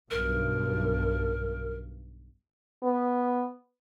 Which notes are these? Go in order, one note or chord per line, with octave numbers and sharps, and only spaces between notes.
B1 G2 A#4
B3